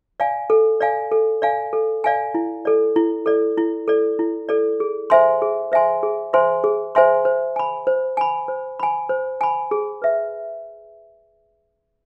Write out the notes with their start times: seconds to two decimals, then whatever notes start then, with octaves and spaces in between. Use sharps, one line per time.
0.20 D5 F5 G#5
0.50 A4
0.81 D5 F5 G#5
1.12 A4
1.42 D5 F5 G#5
1.73 A4
2.04 D5 F5 G#5
2.35 E4
2.65 A4 D5
2.96 E4
3.26 A4 D5
3.58 E4
3.88 A4 D5
4.19 E4
4.49 A4 D5
4.80 G#4
5.10 C5 E5 G#5 C6
5.42 G#4
5.72 C5 E5 G#5 C6
6.03 G#4
6.33 C5 E5 G#5 C6
6.64 G#4
6.95 C5 E5 G#5 C6
7.25 C5
7.56 G#5 B5
7.87 C5
8.17 G#5 B5
8.48 C5
8.79 G#5 B5
9.09 C5
9.41 G#5 B5
9.71 G#4
10.02 B4 E5